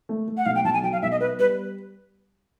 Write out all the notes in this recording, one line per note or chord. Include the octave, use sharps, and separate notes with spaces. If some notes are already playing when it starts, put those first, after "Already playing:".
A3
A3
F#5
B1 F5
G5
B1 A5
G#5
F#3 G5
F5
B1 E5
D#5
B3 B4
G3 B4